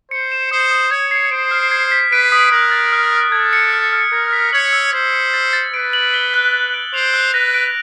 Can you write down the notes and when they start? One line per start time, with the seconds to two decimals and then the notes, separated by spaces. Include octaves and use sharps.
0.11 C5 C#7
0.32 E7
0.51 C5 D#6
0.71 D#6
0.91 C#5 G#6
1.11 C7
1.31 C5 D7
1.51 F6
1.71 G#6
1.92 B6
2.12 B4 D7
2.32 D#6
2.52 A#4 F#6
2.72 A6
2.92 F6
3.12 F6
3.32 A4 G#6
3.53 C#7
3.73 F6
3.93 F6
4.12 A#4 G#6
4.33 B6
4.53 C#5 F#7
4.73 E6
4.93 C5 G#6
5.13 C#7
5.34 A6
5.53 A6
5.74 B4 D7
5.93 F#7
6.14 G7
6.34 F#6
6.53 A6
6.74 D7
6.93 C5 F7
7.14 F#6
7.33 B4 A#6
7.54 D7